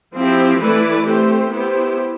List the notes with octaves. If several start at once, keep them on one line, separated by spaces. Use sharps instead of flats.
F3 C4 E4 G4
E3 A3 E4 B4 D5
A3 C4 G4 C5
B3 E4 G4 C5